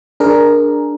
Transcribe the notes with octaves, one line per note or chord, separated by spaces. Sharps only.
D4 G#4 A#4